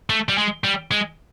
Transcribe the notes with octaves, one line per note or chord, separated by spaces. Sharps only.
A3
G3
G#3
G3
G#3